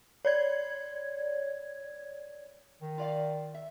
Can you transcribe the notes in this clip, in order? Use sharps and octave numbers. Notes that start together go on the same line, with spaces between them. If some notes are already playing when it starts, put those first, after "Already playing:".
C#5 D5 G#6
D#3
F4 D5 F5
E5